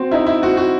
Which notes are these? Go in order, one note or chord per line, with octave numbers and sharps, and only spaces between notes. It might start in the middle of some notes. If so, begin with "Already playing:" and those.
Already playing: C4 F#4
D#4 E4
E4
C4 F#4
F#4